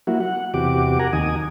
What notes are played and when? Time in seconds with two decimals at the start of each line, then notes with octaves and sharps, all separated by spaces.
0.07 F#3 A#3 E4 F#4
0.20 F#5
0.54 E2 C3 F#4 G4 D6
0.99 A#4 F#5 G#5 A#5
1.13 D#2 D#3 G#5 D#6